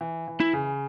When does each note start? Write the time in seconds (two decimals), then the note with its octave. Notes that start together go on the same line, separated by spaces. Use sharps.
0.01 E3
0.28 E3
0.40 E4
0.53 C#3